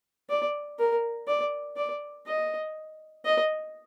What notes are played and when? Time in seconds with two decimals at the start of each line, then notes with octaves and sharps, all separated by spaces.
0.30 D5
0.79 A#4
1.28 D5
1.76 D5
2.26 D#5
3.25 D#5